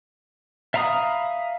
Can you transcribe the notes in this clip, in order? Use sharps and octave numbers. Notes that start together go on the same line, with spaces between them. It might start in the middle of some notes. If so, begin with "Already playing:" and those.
E5 F5 A#5 B5 D#6